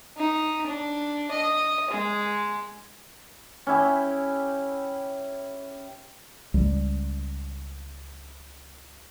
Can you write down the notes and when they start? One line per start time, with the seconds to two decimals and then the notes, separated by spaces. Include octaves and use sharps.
0.17 D#4
0.67 D4
1.31 D#5
1.90 G#3
3.67 C#4 E4 G4
6.54 C#2 G3